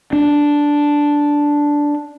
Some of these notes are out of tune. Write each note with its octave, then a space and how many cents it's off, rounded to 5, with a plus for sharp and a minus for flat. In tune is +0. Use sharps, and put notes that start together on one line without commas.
D4 -5